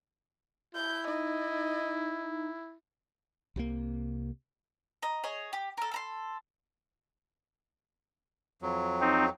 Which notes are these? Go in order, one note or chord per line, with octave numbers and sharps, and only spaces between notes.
E4 G6
D#4 D#5
C2 C3 D#3 A#3
D#5 A#5
G#4 C#5 D#5
G4
A4 A#4
A4 A#5 C6
F2 F#3
C4 D#4